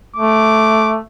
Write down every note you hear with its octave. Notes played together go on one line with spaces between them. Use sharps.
A3 D6